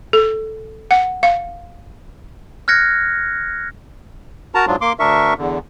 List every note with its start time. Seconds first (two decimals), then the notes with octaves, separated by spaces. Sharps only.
0.13 A4
0.91 F#5
1.23 F5
2.68 F6 F#6 G#6 A#6 C#7
4.55 F#4 A#4 A5 A#5
4.67 G#2 F#3 D4 F4
4.81 A#3 C6 D6
4.99 D2 D4 A#4 E5 C#6
5.38 E2 D3